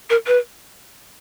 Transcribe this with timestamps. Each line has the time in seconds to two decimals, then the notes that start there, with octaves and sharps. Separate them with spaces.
0.10 A#4
0.27 B4